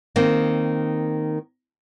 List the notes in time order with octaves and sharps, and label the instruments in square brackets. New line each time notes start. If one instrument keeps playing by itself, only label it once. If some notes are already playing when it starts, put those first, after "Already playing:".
[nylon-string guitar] D#3 A#3 C4